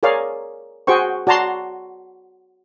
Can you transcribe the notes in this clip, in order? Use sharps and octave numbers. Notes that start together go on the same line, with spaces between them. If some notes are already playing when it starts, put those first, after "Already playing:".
G#4 A#4 C#5 D5 F5
F#4 G#4 C5 G5 C#6
F#4 D5 A5 A#5 C6